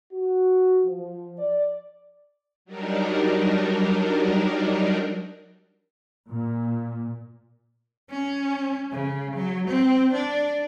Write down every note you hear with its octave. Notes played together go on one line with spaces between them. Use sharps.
F#4
F3
D5
F#3 G3 D4 D#4 A#4
A#2
C#4
C#3
F#3
C4
D4